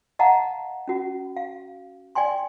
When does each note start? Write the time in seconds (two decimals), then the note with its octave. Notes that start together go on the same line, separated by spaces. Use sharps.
0.19 D#5 F5 F#5 A5 A#5
0.88 C#4 F#4
1.37 F5
2.15 D5 G5 G#5 C6